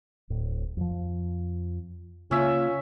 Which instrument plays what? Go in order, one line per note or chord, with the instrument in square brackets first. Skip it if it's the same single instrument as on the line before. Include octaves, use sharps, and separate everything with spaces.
[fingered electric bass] D1 A2
F2 F3
[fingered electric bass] C#3 A#3 [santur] C#4 E5 [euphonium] F4